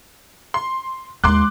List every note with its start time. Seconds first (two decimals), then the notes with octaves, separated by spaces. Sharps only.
0.54 C6
1.24 D#2 G#3 C6 D6 F#6